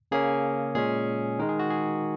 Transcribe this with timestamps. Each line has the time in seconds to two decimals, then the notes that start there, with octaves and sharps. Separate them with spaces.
0.11 C#3 A#3 C#4 G#4
0.75 A#2 G#3 C#4 G#4
1.39 D#3 G#3 D#4 A#4
1.49 G#4
1.59 F#4
1.70 G#4